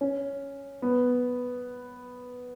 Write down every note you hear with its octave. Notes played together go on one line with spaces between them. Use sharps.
C#4
B3